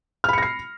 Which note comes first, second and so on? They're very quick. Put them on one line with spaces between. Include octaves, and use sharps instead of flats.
F6 B5 C#7 A#6 C7